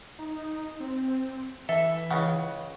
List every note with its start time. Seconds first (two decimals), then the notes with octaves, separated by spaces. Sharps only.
0.19 D#4
0.80 C4
1.69 E3 A4 E5
2.11 C#2 C#3 F#5